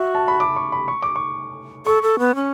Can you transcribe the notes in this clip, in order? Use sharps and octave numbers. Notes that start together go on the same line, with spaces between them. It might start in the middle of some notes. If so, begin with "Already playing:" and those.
Already playing: F#4 E5
A5
B5
D6
C#6
B5
C#6
D6
C#6
A4 C#6
A4
B3
C#4